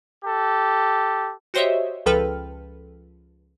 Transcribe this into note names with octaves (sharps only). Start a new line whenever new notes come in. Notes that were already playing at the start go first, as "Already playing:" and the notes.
G4 A4
F#4 G4 C5 C#5 D#5 E5
C#2 F3 A4 B4 G5 F6